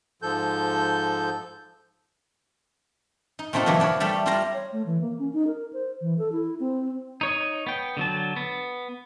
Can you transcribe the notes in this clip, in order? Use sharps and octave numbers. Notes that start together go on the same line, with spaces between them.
G#2 F3 A4 G6
D#4
A#2 A3 C4 D4 D#4 F4
B2 D3 E3 F#3 A#3 B3
F3 D4 B4 C#5
G3 A3 D4 A4
G3 E4 F4 D5 F5 A#5
C#5
A3
E3
A#3
C#4
D#4
A#4
C5
E3
A4
E4
C4
D#4 C#5 D#5
B3 G5
D3 F#3 A5
B3